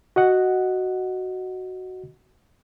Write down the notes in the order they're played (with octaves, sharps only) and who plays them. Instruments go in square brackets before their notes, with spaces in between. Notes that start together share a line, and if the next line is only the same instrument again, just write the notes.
[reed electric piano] F#4 D#5 F#5